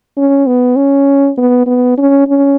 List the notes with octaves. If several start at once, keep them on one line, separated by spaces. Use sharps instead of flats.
C#4
B3
C#4
B3
B3
C#4
C#4